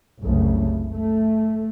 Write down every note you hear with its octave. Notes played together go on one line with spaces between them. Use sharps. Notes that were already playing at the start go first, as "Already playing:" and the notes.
F#1 C2 C#3 A3
A3